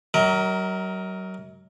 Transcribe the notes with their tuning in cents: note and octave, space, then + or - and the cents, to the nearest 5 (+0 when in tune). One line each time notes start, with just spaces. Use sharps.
F#3 +35 A#4 +0 E5 -45